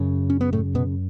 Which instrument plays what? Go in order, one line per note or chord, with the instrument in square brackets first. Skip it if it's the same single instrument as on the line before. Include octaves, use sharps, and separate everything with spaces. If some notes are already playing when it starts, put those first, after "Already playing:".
Already playing: [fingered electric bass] F#2 C#3
C#4
B3
A2 A3
B2 B3